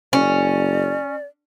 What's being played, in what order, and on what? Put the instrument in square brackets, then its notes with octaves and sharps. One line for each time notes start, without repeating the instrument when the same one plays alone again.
[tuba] F#1 [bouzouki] C#4 [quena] D5